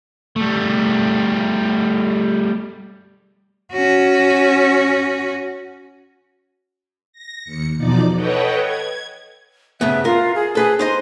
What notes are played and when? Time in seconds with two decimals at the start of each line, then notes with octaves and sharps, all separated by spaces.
0.36 G3 A3
3.72 C#4 F#4
7.13 A#6
7.44 D#2 C#7
7.76 E2 B2 F3 D#4 D5 D6
8.14 A4 B4 C#5 D#5 F#5 G5
8.61 G#6
9.81 G2 C#3 B3 E5
10.05 F4 A#4
10.35 G#4
10.55 G#4 A4 B4 D#5
10.79 D#4 C5 D#5 C6